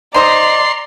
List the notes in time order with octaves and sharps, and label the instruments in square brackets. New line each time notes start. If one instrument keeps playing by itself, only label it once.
[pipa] D#4 C5 D#5 [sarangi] D5 [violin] A#5 [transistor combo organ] C6